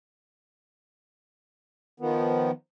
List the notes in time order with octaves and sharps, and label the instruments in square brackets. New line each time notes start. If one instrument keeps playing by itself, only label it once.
[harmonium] D#3 F3 B3